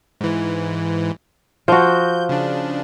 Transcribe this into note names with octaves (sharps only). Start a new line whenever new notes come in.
G#2 E3
F3 F#4 G6
C#3 D4